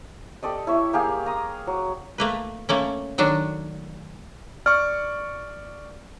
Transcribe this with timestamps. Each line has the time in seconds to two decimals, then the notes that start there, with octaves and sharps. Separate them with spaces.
0.43 G4 A4 D5 D#5
0.67 E4 C#5 E5
0.93 A#3 G4 G#4 F5
1.26 A#5 D#6
1.67 F#3
2.18 A3 A#3 B4
2.69 A3 A#3 C#4
3.18 D#3 F#3 A3 D4
4.66 D5 C#6 F6